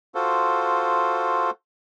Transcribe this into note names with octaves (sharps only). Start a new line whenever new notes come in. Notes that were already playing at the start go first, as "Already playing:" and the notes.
F4 F#4 A4 C5